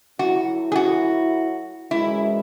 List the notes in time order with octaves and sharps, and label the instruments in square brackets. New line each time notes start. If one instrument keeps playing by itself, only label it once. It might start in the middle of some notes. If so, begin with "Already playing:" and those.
[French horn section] F#3 A3 E4 [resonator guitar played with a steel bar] F#4
[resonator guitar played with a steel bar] G#4
F#4
[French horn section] F#2 E3 G#3 [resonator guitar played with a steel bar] E4